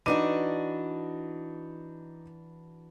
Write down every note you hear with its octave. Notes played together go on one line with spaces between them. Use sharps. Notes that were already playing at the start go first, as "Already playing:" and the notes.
E3 D4 D#4 F#4 D6 D#7